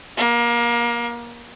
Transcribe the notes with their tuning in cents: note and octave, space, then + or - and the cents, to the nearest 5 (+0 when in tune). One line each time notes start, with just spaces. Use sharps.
A#3 +25 F5 +0